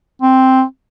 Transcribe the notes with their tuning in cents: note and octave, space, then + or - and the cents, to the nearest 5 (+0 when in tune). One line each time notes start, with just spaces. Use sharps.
C4 +0